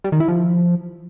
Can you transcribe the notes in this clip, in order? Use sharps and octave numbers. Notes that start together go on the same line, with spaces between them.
G3
D#3
E4
F3